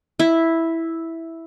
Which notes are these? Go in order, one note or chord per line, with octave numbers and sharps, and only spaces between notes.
E4